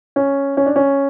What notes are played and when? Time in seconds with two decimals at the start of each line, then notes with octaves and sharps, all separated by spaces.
0.16 C#4
0.57 C#4
0.66 D4
0.76 C#4